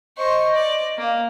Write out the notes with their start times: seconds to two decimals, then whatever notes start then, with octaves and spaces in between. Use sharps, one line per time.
0.18 C5 D#5 C#6
0.55 D5
0.98 A#3